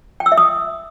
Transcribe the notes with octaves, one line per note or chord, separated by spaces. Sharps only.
G5
E6
E5
D#6